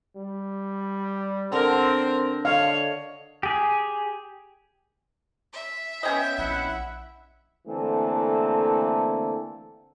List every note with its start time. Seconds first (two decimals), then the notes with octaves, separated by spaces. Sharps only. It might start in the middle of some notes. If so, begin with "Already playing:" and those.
0.16 G3
1.52 D3 C4 A#4
2.45 D3 C#5 D#5 F5
3.43 G4 G#4
5.53 E5
6.03 B3 C#4 D#5 G5
6.38 A#1 E4 F#5
7.67 D3 E3 A3 A#3 C4 A4